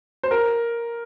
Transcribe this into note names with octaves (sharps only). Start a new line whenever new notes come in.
C5
A#4